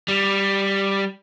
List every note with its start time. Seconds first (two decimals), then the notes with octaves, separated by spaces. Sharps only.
0.08 G3